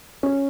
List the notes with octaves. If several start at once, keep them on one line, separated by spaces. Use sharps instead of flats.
C#4